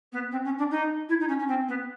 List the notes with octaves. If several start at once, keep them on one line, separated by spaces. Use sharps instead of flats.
B3
C4
C#4
D4
D#4
E4
D#4
C#4
C#4
C4
B3